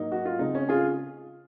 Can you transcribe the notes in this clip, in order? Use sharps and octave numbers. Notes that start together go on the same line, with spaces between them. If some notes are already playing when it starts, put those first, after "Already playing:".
Already playing: G#2 F#3 A#3 D#4
F#4
F4
C#3 G#3 C4 D#4
C#4
F4 G#4